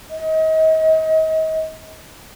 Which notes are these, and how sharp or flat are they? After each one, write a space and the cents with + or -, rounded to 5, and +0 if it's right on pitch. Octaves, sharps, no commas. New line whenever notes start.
D#5 +35